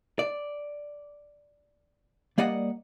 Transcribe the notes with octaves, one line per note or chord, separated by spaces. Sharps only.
D5
G3 A#3 D5 D#5 F#5